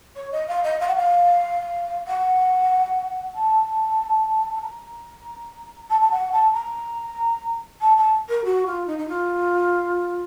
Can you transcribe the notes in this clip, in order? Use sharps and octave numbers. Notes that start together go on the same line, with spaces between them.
C#5
D#5
F5
D#5
F5
F#5
F5
F#5
A5
A5
A#5
A5
A5
F#5
A5
A#5
A5
A5
A#4
F#4
F4
D#4
D#4
F4